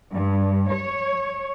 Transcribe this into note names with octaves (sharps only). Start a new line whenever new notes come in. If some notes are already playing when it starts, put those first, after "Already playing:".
G2
C#5